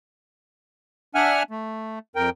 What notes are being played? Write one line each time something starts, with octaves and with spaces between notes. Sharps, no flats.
D4 E5 F#5 G#5 F6
A3
F2 A#4 G5